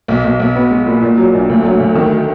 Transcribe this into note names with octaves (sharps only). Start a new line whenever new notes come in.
B1
B1
B1
B3
G#3
A#2
A#2
F#3
A#1
D2
F#3
D2
D#3